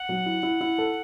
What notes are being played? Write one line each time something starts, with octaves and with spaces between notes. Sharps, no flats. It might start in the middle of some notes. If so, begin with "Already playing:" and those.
Already playing: F#5
F#3
E4
E4
E4
A4